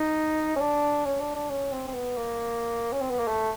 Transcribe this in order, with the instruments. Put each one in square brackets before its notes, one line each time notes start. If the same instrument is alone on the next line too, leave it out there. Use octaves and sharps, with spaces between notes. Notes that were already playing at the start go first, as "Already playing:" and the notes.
Already playing: [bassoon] D#4
C#4
D4
C#4
D4
D4
C#4
C4
C4
B3
A#3
C#4
C4
B3
A#3
A3